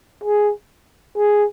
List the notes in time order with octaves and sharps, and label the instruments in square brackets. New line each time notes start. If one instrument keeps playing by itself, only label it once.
[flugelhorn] G#4
G#4